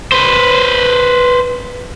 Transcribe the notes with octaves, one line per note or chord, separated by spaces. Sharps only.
B4 C5